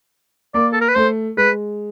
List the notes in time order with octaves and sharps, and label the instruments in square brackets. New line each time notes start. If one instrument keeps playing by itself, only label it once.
[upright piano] A#3 [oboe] D5
[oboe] A4
A#4
B4
[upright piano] A3 [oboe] C5
[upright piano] G#3 [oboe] B4